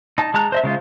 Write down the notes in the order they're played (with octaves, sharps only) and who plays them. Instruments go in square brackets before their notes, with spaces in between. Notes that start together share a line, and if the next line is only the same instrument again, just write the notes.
[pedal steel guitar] D#4 A5
G#3 A5 A#5 F#6
C5 D#5 E5
C#3 G#3 F4